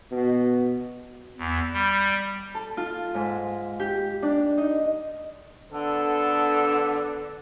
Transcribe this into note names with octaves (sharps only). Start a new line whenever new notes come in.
B2
E2
G3
A4
F4
G#2
G4
D4
D#4
D3 B3 A4